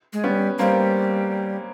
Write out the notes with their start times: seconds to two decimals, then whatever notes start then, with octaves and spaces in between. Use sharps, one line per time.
0.13 G#3
0.24 G3 B3 C#4
0.59 G3 A#3 C4